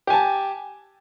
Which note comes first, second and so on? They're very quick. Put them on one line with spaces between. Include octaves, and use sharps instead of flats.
G4 G#5 A5